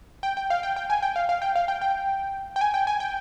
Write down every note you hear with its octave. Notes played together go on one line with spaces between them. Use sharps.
G5
G5
F5
G5
G5
G#5
G5
F5
F5
G5
F5
G5
G5
G5
G#5
G5
G#5
G5